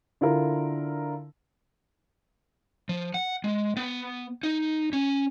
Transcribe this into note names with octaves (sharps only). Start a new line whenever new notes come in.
D3 E4 F4 A#4
F3
F#5
G#3
B3
D#4
C#4